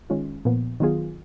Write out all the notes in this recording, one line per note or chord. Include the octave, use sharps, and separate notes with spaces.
D#3 G#3 C#4 F4
A#2 F3 B3
D#3 F#3 B3 F4 G#4